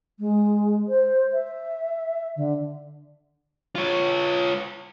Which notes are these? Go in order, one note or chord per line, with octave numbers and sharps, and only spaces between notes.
G#3
C5
E5
D3
F4 C#5